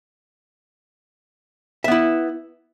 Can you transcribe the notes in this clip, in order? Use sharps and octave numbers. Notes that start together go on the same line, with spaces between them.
B3 E4 E5